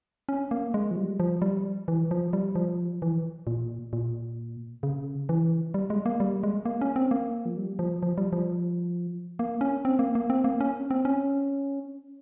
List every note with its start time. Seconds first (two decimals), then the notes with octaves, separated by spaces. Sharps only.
0.29 C#4
0.51 A#3
0.74 G#3
0.91 F3
0.96 G3
1.20 F3
1.42 G3
1.88 E3
2.11 F3
2.33 G3
2.55 F3
3.02 E3
3.47 A#2
3.93 A#2
4.83 C#3
5.29 E3
5.74 G3
5.90 G#3
6.06 A#3
6.20 G3
6.43 G#3
6.65 A#3
6.81 C#4
6.96 C4
7.11 A#3
7.45 F3
7.57 G3
7.79 F3
8.03 F3
8.18 G3
8.33 F3
9.39 A#3
9.61 C#4
9.85 C4
9.99 A#3
10.15 A#3
10.30 C4
10.44 A#3
10.61 C#4
10.91 C4
11.05 C#4